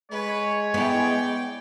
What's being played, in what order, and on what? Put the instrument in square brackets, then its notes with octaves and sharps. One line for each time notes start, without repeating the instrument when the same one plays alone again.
[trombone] G#3 [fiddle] B4 [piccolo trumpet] C#5
[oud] B3 E4 [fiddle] D5 G5